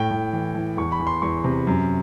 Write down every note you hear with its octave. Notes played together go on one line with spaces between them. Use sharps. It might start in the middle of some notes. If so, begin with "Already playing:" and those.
Already playing: A2 G5
A2
E3
E3
E2 C#6
B5
E3
C6
E2 C#6
C3
F#2